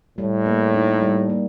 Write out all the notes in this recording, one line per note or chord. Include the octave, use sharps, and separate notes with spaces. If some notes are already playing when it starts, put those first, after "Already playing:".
A2 G3
A#3
D#4
G3
A#3